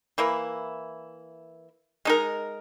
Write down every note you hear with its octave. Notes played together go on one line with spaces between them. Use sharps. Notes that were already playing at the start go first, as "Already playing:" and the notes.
E3 A#3 E4
G#3 D#4 A#4